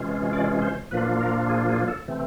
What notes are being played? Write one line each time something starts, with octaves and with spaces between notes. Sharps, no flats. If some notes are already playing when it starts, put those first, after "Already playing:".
Already playing: C3 E3 G#3 C#4 F4
D5
C5
A#2 F3 A#3 D4 F4 B4
A#4
G#4
G#4
A4
C3 E3 A3 C4